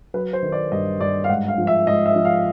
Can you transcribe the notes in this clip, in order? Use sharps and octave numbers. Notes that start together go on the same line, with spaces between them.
F#3 B4
C5
D#3
D5
G2 D#5
G2 D5
F5
G#2 F#5
F5
F3
E5
G#2 D#5
E5
F3
F5